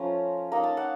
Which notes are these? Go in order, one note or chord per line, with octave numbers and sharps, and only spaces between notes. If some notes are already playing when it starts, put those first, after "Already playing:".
Already playing: F3 A3 C#4 F4 A#5
A#3 D#4 A#5
A5
F#5